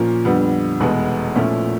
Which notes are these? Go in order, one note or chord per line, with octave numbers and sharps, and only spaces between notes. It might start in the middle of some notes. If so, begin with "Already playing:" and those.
Already playing: A#2 F3 A#3 C#4
F2 D3 G3 B3
F1 E2 B2 G#3 B3
A#2 F3 A3 C#4 E4